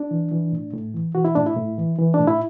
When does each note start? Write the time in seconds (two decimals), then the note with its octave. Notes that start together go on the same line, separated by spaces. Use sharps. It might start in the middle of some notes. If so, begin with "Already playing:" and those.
Already playing: D4
0.11 E3
0.32 E3
0.52 A2
0.74 A2
0.94 E3
1.15 E3 F#4
1.25 E4
1.35 A2 D4
1.46 E4
1.56 A2
1.78 E3
1.99 E3
2.14 D4
2.20 A2
2.28 E4